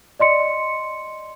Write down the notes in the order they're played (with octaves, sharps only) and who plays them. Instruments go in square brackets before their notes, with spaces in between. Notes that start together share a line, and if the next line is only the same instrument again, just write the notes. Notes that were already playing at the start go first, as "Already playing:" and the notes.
[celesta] D5 D#5 C6 C#7